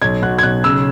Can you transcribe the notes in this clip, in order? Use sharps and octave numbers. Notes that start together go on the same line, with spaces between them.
B1 G#6
B2 F#6
G#6
B1 F#6
C#3 E6